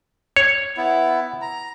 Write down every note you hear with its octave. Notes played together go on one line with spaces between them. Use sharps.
C#5
B3 E4
A#5